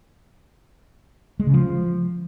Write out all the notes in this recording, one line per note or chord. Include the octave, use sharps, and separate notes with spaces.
G#3
C#3
F3